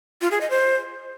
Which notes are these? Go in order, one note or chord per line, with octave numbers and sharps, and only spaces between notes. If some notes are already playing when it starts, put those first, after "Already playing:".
F4
G#4
D#5
C5